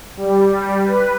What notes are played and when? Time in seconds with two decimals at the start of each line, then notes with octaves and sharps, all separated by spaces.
0.17 G3
0.84 B4